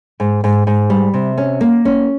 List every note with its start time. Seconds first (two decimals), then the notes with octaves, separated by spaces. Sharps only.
0.20 G#2
0.44 G#2
0.67 G#2
0.90 G3
1.14 C3
1.38 C#4
1.61 A#3
1.85 C#4